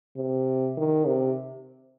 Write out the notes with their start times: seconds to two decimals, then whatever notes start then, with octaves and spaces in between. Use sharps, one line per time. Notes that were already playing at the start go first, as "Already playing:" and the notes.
0.16 C3
0.77 D#3
1.07 C3